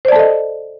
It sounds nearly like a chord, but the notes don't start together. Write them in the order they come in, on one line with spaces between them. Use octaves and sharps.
C5 D5 A5 A4 D#5